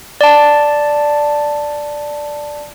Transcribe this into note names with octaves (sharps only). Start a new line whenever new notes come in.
D5 A5